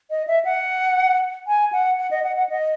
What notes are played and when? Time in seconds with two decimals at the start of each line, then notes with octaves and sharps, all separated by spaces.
0.11 D#5
0.28 E5
0.45 F#5
1.47 G#5
1.73 F#5
1.98 F#5
2.11 D#5
2.24 F#5
2.36 F#5
2.49 D#5